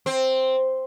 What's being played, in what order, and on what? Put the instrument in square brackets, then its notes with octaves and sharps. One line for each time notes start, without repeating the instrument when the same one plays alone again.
[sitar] C4